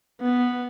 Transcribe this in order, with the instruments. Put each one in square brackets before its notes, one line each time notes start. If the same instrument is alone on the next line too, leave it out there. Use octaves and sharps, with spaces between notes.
[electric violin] B3